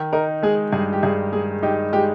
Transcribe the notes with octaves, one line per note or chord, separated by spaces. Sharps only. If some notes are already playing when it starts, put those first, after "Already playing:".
Already playing: D#3
D#4 A#4
G#3 G#4
G2 G#4
G4
G2 G#4
G#3 G#4
D#4 G4
G#3 G4